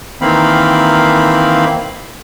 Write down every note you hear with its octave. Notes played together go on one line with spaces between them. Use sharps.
D#3 E3 A#3 C4 F5 B5